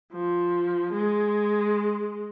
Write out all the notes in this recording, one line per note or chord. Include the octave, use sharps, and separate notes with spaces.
F3
G#3